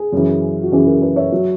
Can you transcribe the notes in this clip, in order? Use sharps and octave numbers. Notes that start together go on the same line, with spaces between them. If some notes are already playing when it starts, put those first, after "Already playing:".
Already playing: G#4
F#2 C#3 E3
F#4
F#2 C#3 E3 G#4
F#4 A#4
G#4 B4
C#5 E5
F#3